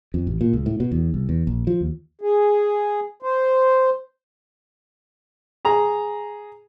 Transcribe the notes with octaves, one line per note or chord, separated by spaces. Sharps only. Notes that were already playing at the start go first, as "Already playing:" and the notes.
F2
A1
A#2
C#2
A2
B2
E2
C2
E2
A#1
F3
D#2
G#4
C5
G#4 A#5